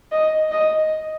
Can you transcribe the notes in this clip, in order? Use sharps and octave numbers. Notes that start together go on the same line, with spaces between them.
D#5
D#5